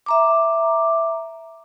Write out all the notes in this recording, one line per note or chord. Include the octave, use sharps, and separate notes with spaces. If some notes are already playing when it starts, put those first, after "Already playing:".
E5 A#5 D6